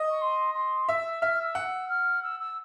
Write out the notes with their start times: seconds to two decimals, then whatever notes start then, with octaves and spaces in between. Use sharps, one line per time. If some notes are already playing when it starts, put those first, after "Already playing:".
Already playing: D#5
0.10 C#6
0.21 C6
0.54 C6
0.88 E5 E6
1.21 E5 F6
1.39 E6
1.55 F#5
1.88 F6
2.22 E6
2.39 E6